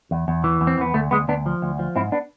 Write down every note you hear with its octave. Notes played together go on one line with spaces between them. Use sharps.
E2
E2
E3
E2
C4
E2 B3
D2 A3
D2 G#3 B3
D2 B3 D4
F3
D2
F3
G#2 C4 E4
B3 D4